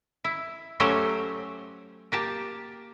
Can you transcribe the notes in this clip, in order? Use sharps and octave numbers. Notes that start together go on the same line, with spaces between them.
E4
F#3 A3 C#4 G4 C5 C#5
A#3 G4 A5